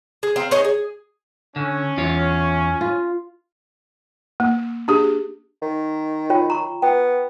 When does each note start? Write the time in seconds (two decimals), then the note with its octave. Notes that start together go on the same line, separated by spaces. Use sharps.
0.23 G#4
0.36 C4 F5 A#5
0.51 D#4 G#4 C#5 D#5
0.64 G#4
1.56 D3 C#4
1.97 E2 F4 C#5
2.81 F4
4.40 A#3
4.88 D4 G4 G#4
5.62 D#3
6.30 F4 C#5 G5
6.50 A#5 C#6
6.82 B3 G5